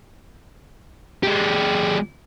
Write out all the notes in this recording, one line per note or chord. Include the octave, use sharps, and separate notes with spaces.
G#3 G4